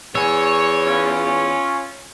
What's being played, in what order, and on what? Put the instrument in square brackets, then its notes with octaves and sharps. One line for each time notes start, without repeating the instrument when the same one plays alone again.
[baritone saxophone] E2 [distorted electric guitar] C#5 [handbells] G#5 E6
[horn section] C#4 F4